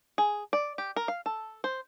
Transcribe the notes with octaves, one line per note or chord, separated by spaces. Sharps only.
G#4
D5
G4
A#4
F5
A4
C5